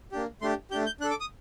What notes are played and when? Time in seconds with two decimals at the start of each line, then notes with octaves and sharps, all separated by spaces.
0.12 A#3 D4 G4
0.41 A3 D4 G4 C6
0.71 A3 D4 G4 G6
0.86 G6
1.00 D4 F#6
1.04 A4
1.11 D6
1.21 D#6